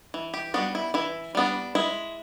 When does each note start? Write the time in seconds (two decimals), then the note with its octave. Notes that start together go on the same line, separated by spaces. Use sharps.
0.14 E3
0.34 G4
0.54 G3 B3 D4 F#4
0.75 E4
0.94 E3 E4
1.35 G3 B3 D4
1.75 G#3 E4